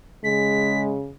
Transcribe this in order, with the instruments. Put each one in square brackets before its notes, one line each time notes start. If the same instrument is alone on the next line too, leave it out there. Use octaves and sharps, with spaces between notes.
[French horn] C#3 [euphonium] G#3 [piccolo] B6